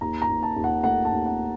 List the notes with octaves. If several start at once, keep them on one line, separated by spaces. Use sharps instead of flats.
D#2 A#5
A#5
D#2
A5
D#2
F#5
A3 F#5
A5
D#2
F#5